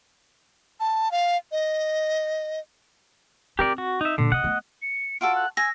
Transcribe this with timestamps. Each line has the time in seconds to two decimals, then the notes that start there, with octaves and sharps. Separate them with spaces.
0.80 A5
1.12 F5
1.52 D#5
3.59 C4 F4 G4 A#4 D5
3.78 F#4
4.01 D#4 E5
4.18 A#2 D3
4.32 C#3 D#5 F#5
4.44 A3 B3
4.82 C#7
5.21 F4 F#4 A4 D7
5.35 F#6
5.57 G#5 E6 A#6